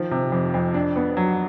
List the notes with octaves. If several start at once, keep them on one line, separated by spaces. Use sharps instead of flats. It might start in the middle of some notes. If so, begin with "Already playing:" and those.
Already playing: D#3 F3
C3
F2
F2
D4
B3
F#3